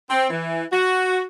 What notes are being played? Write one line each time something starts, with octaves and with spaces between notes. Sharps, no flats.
C4
E3
F#4